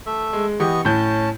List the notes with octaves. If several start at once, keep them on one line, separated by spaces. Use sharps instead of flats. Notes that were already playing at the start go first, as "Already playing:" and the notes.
A3 E5
G#3
E3 B3 G4 D#5 C#6
A2 C#4 A5 G6